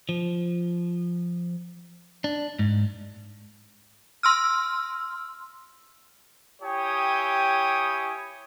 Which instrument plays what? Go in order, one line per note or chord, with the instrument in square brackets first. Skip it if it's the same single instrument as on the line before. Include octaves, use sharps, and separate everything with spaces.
[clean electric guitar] F3
D4
G#2
[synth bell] C6 E6 F6
[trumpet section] E4 G4 C#5 G5 G#5 D#6